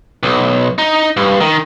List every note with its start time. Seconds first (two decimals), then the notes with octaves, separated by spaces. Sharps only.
0.23 B1
0.78 D#4
1.17 G2
1.40 D#3